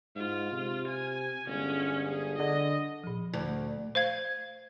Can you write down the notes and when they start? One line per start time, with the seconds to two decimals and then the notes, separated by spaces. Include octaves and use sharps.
0.16 G#2 F4
0.52 C3
0.88 G#5
1.47 G1 G#3 C#4
2.09 G#4
2.39 D3 D#5
3.04 A#2 F3
3.33 D2
3.95 C5 F5 G#6